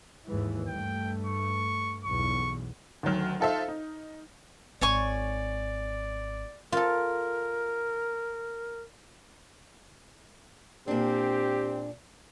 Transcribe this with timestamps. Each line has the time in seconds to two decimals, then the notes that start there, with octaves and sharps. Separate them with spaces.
0.25 D#2 G#2 E3
0.68 G2 A3 G5
1.26 C#6
2.05 B1 E2 C#6
3.03 D2 D#3 F#3 F6
3.40 D#4 F4 A4 C5 E5 F5
3.68 D#4
4.81 G#1 C#5 D5 G#5 C#6
6.72 F4 A4 A#4
10.88 A#2 C4 D4 G4